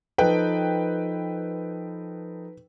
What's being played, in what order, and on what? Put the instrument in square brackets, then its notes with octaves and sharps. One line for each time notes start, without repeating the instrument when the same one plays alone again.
[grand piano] F3 D#4 A4 [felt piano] B4 G5